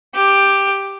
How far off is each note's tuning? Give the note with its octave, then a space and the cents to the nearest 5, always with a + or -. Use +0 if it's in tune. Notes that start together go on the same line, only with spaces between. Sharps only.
G4 +5